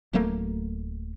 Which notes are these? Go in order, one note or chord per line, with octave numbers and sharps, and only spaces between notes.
D1 F#3 A3 A#3